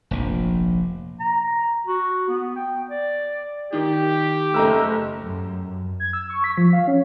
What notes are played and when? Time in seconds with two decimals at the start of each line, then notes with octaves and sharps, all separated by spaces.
0.11 F1 A#1
1.20 A#5
1.87 F#4
2.28 B3
2.56 G5
2.90 D5
3.73 D#3 G4
4.54 F#1 A3 A#5 E6
5.22 F#2
6.00 G#6
6.13 E6
6.30 C#6
6.44 B6
6.58 F3
6.73 F5
6.88 C#4